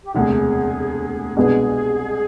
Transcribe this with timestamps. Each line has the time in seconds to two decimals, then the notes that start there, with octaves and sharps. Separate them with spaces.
0.04 G4
0.14 E1 D2 C3 G#4
1.37 C2 B2 G#3 B3 D4 G#4